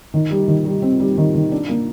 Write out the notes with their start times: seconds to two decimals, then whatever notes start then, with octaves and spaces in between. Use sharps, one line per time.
0.14 D#3
0.31 G3
0.48 D#3
0.66 G3
0.82 C4
1.00 G3
1.18 D#3
1.35 D#3
1.52 D4
1.69 A#3